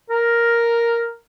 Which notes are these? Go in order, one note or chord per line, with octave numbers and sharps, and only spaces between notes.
A#4